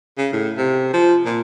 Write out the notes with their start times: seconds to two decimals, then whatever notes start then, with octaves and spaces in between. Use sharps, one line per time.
0.18 C#3
0.33 A2
0.57 C3
0.94 F3
1.26 A#2